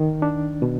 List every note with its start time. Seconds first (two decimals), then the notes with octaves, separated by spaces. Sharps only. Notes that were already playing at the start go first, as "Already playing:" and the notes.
Already playing: D#3
0.22 D4
0.62 B2